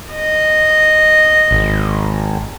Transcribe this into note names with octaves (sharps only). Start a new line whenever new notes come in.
D#5
G#1